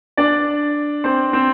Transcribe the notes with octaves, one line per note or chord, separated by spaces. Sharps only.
D4 D5
C4 C5
C4 C5